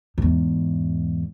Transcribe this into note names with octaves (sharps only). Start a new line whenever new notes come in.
E2 G#2